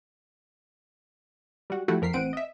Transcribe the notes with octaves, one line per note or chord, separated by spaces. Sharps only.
G3 F#4
F3 A3 E4 F#4 G4
F2 A#4 B6 C7
A1 C4 F#5 D7 D#7
D#5 E5